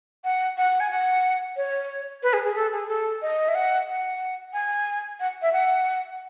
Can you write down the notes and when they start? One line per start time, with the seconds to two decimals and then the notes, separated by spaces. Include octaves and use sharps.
0.24 F#5
0.58 F#5
0.80 G#5
0.91 F#5
1.56 C#5
2.23 B4
2.33 G#4
2.44 G#4
2.55 A4
2.72 G#4
2.88 A4
3.22 D#5
3.48 E5
3.55 F#5
3.88 F#5
4.53 G#5
5.20 F#5
5.42 E5
5.53 F#5